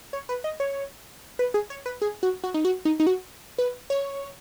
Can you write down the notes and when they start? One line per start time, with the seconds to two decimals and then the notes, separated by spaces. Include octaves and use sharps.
0.13 C#5
0.29 B4
0.44 D#5
0.60 C#5
1.39 B4
1.54 G#4
1.70 C#5
1.86 B4
2.02 G#4
2.23 F#4
2.43 F#4
2.54 D#4
2.65 F#4
2.85 D#4
3.00 D#4
3.07 F#4
3.58 B4
3.90 C#5